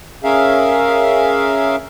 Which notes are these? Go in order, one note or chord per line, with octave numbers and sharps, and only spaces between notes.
C#4 G#4 A#4 E5 F5